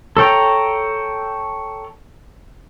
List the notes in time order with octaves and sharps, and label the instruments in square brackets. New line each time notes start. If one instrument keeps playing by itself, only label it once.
[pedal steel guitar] A4 C#5 G5 A#5